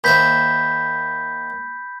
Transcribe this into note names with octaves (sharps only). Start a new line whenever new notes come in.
D#2 C5 E5 B5 G6 B6